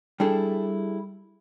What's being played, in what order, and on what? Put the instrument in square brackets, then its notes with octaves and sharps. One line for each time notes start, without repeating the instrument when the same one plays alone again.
[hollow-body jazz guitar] G3 D4 E4 G#4 A4